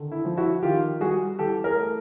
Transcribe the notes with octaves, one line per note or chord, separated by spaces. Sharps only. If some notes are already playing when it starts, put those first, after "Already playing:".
Already playing: D3 D#3
E4
F3
E4 F#4
D#3 F4 G4
G3 F#4 G#4
E3 G4 A4
G#4 A#4
A3